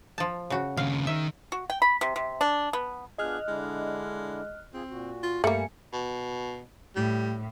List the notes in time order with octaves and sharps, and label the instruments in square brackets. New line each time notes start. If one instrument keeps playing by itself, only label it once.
[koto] F3 A5
C#3 F#4
[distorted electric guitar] D#2 C#3 [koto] F5
[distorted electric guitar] D#3 [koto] E5
[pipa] F#4
G5
B5
C3
C3
D4
B3
[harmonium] B3 D4 F4 [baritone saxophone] G#4 [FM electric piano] D#5 F6 F#6
[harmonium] D3 D4 E4 [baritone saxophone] G#3
[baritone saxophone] C4 [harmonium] F4 G#4
[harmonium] A#2 F#4
[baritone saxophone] F4
[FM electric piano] G2 G#5 C#7 [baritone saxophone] G3 [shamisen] A3 A#3
[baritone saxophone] B2
[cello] A2 [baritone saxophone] G3